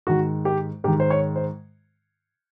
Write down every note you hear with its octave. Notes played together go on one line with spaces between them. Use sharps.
G#2 D#3 F#4
G4
G#2 D#3 G4
C5
C#5
C5